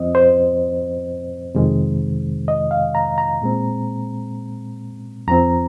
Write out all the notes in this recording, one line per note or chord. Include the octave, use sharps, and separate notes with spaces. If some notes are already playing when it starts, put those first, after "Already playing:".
Already playing: F2 F3 C4 D#5
C5
F2 C3 D#3 G#3
D#5
F5
A#5
A#5
A#2 G#3 C4
F2 F3 C4 A#5